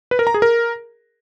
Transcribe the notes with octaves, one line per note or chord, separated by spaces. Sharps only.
B4
A#4
A#5
G#4
A#4